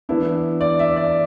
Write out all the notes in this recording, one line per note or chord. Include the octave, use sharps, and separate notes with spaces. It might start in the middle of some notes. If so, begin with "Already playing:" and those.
E3 B3 D4 E4
D5
E5
D5